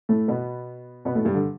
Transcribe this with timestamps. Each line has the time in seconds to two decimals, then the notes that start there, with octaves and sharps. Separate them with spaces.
0.09 A2 A3
0.28 B2 B3
1.05 B2 B3
1.15 A2 A3
1.25 G2 G3
1.35 D3